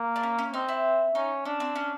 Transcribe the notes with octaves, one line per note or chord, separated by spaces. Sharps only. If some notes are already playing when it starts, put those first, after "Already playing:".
Already playing: A#3
D4
C#4
C#4
C4 D#4
E4
C#4 D#4
C#4 D4
C4
C#4